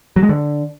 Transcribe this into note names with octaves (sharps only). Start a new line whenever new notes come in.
F#3
G#3
D3